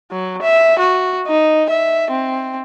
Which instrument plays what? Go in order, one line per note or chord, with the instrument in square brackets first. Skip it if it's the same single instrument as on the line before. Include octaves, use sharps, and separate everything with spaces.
[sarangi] F#3
E5
F#4
D#4
E5
C4